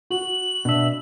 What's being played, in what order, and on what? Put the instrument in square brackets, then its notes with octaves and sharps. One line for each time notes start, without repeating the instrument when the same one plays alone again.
[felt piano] F#4 [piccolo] F#7
[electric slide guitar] B2 E5 [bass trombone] D4